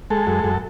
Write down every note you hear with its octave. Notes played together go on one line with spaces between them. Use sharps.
G#3 A4
F#2
F#2